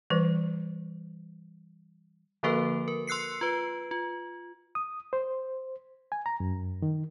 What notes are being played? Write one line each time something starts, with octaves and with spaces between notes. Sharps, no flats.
E3 G3 B4
D3 F3 A#3 F#4 A4 B4
A#4
C6 E6 F#6 C7 C#7
F4 B4
F4
D#6
C5
G#5
A#5
F#2
D#3